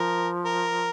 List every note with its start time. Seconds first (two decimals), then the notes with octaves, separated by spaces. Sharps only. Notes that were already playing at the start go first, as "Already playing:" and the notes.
Already playing: F3 A#4
0.45 A#4